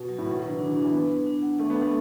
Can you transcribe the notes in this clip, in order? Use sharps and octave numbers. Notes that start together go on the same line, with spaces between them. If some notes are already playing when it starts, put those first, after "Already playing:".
Already playing: B2
F#3
A2
B2 F#5
F#3
B4
D3
D3 D4
E3
D4
E3
B3 B4
D4
D4
F#5
A3 D4
B3
D4
A3